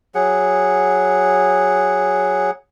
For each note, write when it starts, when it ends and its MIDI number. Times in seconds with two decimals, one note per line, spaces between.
0.15 2.51 54
0.15 2.51 68
0.15 2.51 78